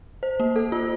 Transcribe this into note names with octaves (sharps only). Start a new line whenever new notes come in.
C5
A#3
A4
F4